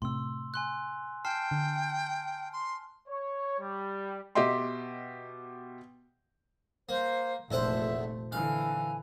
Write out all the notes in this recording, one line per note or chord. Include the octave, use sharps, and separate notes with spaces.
A2 C3 C6 E6
G#5 C6 F#6
G5 A5 F6 C7
D3
C6
C#5
G3
B2 G4 D#5 E5 G5 C6
A#3 C5
F1 E2 A#2 A3 A4 C5 E5 F#5
D3 E3 F5 G#5